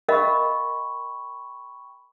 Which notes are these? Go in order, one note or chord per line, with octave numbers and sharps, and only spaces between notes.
A#4 D#5 F5 G5 B5 C#6